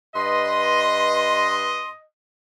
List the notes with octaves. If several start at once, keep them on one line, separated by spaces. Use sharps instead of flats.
G2 B4 D#5 C6